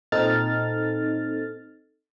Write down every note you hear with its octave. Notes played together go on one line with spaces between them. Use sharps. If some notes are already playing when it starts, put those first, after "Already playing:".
A#2 C4 D#4 A4 F6 A6